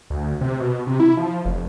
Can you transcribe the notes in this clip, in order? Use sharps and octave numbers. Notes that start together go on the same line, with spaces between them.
D2
C3
B2
C3
E4
F3
F1